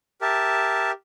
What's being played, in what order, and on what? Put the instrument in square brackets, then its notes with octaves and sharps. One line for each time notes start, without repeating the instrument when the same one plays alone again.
[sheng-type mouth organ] G4 A#4 E5 A5